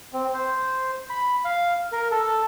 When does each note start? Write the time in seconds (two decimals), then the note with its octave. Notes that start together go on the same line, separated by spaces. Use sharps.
0.13 C4
0.34 C5
1.10 B5
1.45 F5
1.92 A#4
2.11 A4